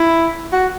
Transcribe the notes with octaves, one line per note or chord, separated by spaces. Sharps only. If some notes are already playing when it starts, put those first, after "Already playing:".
Already playing: E4
F#4